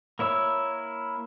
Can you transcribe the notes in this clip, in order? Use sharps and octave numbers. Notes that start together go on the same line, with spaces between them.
A#3 E4 C#5 E6